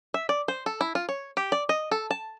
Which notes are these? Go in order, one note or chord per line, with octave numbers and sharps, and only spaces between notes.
E5
D5
C5
A4
E4
F4
C#5
G4
D5
D#5
A4
A5